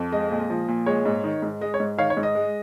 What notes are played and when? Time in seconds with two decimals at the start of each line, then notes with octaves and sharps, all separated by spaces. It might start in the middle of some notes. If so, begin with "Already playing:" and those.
Already playing: F2
0.12 G#3 D#5
0.31 A#2
0.50 F3
0.68 A#2
0.86 G#3 C#5
1.05 G#2
1.24 D#3
1.42 G#2
1.61 G#3 D#5
1.74 C#5
1.80 G#2
1.98 D#3 C#5 F5
2.10 C#5
2.17 G#2
2.23 D#5
2.35 G#3